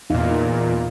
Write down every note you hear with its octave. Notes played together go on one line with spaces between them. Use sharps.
E2 A#2 D#4 F5